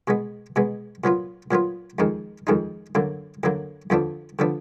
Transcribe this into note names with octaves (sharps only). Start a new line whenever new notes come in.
B2 G#3 B3
B2 G#3 B3
A#2 F#3 B3 F4
A#2 F#3 B3 F4
F2 D#3 G#3 D#4
F2 D#3 G#3 D#4
F#2 D3 F#3 A#3
F#2 D3 F#3 A#3
F2 D3 F3 B3 D4
D3 F3 B3 D4